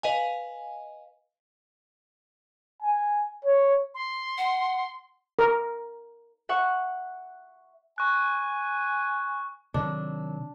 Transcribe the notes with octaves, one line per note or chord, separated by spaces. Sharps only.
B4 D#5 F5 G#5
G#5
C#5
C6
F#5
A#4
E5 F#5 C#6
G#5 C#6 F#6
C3 D#3 F#3 D4